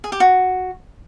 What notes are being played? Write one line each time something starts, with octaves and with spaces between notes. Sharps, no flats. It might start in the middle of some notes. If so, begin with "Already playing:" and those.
G#4
G4
F#4